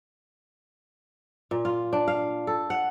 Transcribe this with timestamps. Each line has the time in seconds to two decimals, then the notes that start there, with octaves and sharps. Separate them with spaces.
1.51 A#2
1.65 F4
1.93 D4
2.08 F5
2.47 A4
2.70 F#5